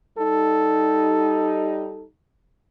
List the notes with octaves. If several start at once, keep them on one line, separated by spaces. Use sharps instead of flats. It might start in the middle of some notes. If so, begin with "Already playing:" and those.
G3 D#4 A4